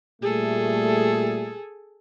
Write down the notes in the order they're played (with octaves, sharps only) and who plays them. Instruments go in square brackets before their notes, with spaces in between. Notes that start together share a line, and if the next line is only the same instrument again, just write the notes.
[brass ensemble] A#2 G3 A3 [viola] G#4 A4